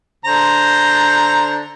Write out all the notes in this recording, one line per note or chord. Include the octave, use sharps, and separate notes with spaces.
D3 C5 A#5